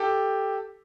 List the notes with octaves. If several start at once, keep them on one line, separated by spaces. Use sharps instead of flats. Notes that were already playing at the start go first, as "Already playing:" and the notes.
Already playing: G4 A4